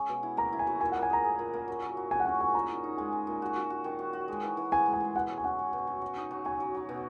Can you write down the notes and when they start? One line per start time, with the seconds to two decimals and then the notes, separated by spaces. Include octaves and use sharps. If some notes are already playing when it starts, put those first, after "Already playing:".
Already playing: G#3 C#4
0.09 B2
0.23 E4
0.37 A#3 A#5
0.52 E4
0.59 G#5
0.67 F#3
0.81 A#2 G#5
0.92 F#5
0.96 A#3
1.03 G#5
1.10 G#4 A#5
1.24 G#4
1.39 A#2
1.53 A#3
1.68 F#3
1.82 F#3
1.97 F#3
2.11 F#3 G#5
2.20 F#5
2.25 C#4 G#5
2.40 F#3 G#5
2.55 A#2 A#5
2.69 D#4
2.84 D#4
2.97 G#3 G#5
3.12 G#3
3.27 A#2
3.42 F#4
3.56 F#4
3.70 F#4
3.84 D#3
3.99 F#4
4.13 F#4
4.28 G#3
4.43 E3
4.57 E3
4.72 E3 G#5
4.86 G#3
4.94 G#5
5.00 G#3
5.15 B2 F#5
5.29 F#3
5.38 G#5
5.44 C#4 F#5
5.59 F#3
5.73 B2
5.87 F#3
6.02 F#3
6.17 D#4
6.31 F#3
6.45 F#3 G#5
6.60 F#3
6.74 F#3
6.89 B2